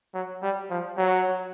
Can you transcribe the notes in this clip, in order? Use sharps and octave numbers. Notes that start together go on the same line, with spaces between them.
F#3
G3
F3
F#3